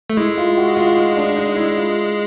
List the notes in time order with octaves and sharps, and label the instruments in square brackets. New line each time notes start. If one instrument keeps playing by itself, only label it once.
[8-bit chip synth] A3
[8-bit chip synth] G#3 [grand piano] E4
[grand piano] F4
F#4
F4
D#4
D4
D#4
E4
F4